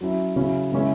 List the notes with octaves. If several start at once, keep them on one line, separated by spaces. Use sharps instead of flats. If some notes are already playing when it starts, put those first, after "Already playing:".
F#3 C#4 E4
C#3 F#3 C#4 E4
C#3 G#3 C#4 E4